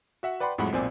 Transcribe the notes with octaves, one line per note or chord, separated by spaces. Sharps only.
F#4 E5 F#5
B4 D5 F#5 G5 B5 C6
F2 A2 F#3 G#3 F#5 B5
B1 A#2 C4 C5 D5 G#5